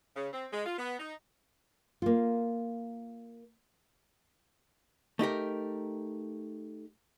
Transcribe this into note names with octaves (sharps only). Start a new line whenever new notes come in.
C#3
C4
G#3
F4
B3
D#4
A#3 F4
A3 D#4 G4 A#4